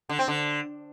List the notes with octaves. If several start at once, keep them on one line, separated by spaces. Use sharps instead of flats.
D3
C4
D3